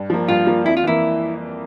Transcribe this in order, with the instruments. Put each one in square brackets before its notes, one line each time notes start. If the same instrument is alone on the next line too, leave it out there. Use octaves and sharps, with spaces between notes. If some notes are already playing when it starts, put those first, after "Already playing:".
Already playing: [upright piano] G2
F3 A#3
[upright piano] G2 [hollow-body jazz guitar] F4
[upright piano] F3 A#3
[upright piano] F2 [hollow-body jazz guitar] E4
[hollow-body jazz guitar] F4
[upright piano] E3 A#3 [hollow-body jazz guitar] E4